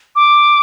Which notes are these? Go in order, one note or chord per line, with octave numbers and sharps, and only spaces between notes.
D6